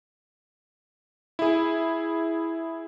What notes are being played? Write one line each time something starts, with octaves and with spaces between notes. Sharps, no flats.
E4 G#4